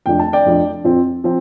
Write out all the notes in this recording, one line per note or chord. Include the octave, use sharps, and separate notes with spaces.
F1 F2 F3 D4 G5
A5
D5 G5
F1 F2 F3 D4
F2 F3 C4
F3 C4